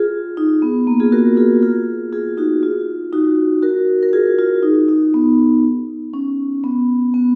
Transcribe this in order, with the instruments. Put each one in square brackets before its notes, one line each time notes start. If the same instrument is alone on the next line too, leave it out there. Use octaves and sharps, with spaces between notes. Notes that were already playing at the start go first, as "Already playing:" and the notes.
Already playing: [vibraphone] F4 G#4
D#4
B3
A#3
F4 G#4
F#4 A#4
F4 G#4
F4 G#4
F4 G#4
D#4 F#4
F4
D#4 F#4
F#4 A#4
A#4
F4 G#4
F4
D#4
D#4
B3
C#4
B3
B3